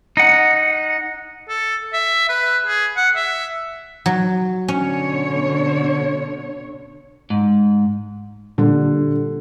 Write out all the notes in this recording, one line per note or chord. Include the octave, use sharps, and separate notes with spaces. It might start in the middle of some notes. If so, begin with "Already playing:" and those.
D#4 F#5
A4
E5
B4
G#4
F#5
E5
F#3
B2 D3 C#4 C#5
G#2
A#2 D3 G3